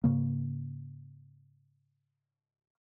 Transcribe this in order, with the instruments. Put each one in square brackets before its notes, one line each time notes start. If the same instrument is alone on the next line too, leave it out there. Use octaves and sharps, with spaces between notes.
[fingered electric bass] G#2 C#3 A#3